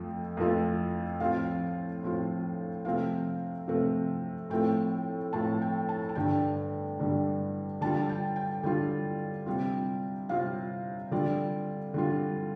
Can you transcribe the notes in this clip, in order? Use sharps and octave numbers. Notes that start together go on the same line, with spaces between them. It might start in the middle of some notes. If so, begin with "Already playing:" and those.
Already playing: F2 F3 A3 G5
F2 F3 A3 F4
A2 F3 C4 F4 F5
A2 F3 C4 F4
C3 F3 A3 C4 F5
C3 F3 A3 C4
A2 F3 A3 C4 G5
A2 F3 A3 C4 A5
G5
A5
A5
G2 D3 G3 G5
G2 D3 G3
D3 G3 F4 A5
G5
G5
D3 G3 F4 G5
C3 G3 C4 F4
C3 G3 C4 F4 F5
D3 G3 F4 D5
D3 G3 F4